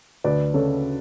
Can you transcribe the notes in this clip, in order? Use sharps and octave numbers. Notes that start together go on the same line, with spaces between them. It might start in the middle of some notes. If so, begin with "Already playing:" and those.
D2 B4 D5
C#3 A4 C#5